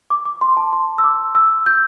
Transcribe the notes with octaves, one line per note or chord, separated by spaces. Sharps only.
D6
D6
C6
A5
C6
E6
D6
E6
G6